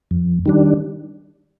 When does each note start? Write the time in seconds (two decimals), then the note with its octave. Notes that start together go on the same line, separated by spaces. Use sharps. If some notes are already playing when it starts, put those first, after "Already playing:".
0.11 F2
0.46 D#3 G3 D4